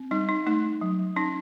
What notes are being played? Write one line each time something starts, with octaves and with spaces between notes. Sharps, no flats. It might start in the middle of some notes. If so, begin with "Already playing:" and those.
Already playing: C4
G3 D#4
D#4
A3 D#4
F#3
C#4 D#4